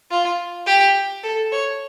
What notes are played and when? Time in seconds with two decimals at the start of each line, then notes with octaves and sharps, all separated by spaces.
0.10 F4
0.66 G4
1.23 A4
1.52 C#5